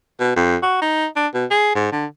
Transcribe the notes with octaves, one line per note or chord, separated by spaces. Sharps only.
B2
F2
F#4
D#4
D4
B2
G#4
G#2
D3